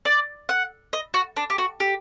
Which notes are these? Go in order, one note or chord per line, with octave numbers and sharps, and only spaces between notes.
D5
F#5
D#5
F#4
D4
G4
F#4
G4